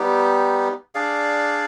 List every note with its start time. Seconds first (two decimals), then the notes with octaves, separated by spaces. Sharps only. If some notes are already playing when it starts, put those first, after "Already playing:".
Already playing: G3 B3 D#4 G4
0.95 D4 G#4 D5 F5